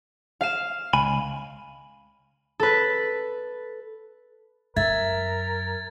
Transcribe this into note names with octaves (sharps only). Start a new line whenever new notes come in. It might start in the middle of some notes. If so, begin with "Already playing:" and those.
F5 E7
C#2 G#5 B5
A4 B4
F#2 A#4 E5 G#6 A6